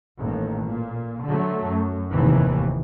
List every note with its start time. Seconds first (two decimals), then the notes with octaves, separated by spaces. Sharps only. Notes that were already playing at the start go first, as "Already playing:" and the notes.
0.20 A1 D#2
0.66 A#2
1.25 D3 F#3 A3
1.66 F#2
2.13 F1 D#2 A2 C3 D#3 E3